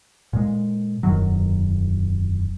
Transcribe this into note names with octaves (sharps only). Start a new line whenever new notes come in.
A#2 G#3
E1 F#2 D#3 F#3